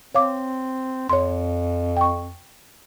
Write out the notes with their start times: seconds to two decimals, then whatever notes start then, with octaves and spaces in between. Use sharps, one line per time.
0.15 C4 C#5 F5 D6
1.09 F2 C#5 C6
1.97 G5 C#6